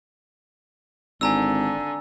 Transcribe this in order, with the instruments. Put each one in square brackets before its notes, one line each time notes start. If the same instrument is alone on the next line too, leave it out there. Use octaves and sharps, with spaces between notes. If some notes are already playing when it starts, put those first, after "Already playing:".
[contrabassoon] G#1 [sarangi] D3 [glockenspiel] G#5 A#5 E6